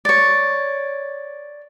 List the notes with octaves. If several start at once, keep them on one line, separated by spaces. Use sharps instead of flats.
C#5 D5